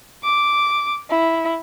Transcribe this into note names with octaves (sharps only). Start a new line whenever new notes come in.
D6
E4